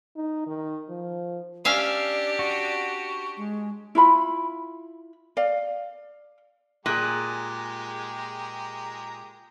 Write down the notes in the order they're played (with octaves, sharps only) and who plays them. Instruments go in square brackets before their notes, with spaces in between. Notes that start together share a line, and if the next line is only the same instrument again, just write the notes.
[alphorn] D#4
D#3
F3
[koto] C#4 E5 F5 [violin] D4 G4 [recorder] D5
[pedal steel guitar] F#4
[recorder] G#3
[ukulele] E4 F4 B5
D5 F5
[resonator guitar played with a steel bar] A#2 [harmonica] G#3 G4 A#5 [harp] G#4 F#6